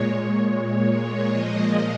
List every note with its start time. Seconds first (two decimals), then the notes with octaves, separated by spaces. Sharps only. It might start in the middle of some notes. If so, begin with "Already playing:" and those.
Already playing: A#2 G#3 C#5
1.30 A#2 F3 G#3 D#5